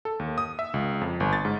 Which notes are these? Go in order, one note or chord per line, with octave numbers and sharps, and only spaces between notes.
A4
D#2
D#6
E5
C#2
F2
G1
A6
G#2